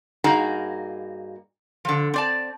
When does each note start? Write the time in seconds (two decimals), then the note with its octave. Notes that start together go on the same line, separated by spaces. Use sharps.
0.24 G2 A#3 D#4 F#4 G#4 A#5
1.85 D3 F3
2.14 C4 D5 A5